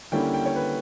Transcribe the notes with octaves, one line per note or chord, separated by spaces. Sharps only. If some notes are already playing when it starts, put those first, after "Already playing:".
D3 G3 A#3 C#4 E4 G5
G5
G5
C#5
B4